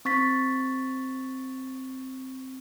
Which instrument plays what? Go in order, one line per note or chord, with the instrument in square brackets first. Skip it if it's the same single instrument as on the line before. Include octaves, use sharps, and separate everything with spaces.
[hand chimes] C4 C#6 A6 B6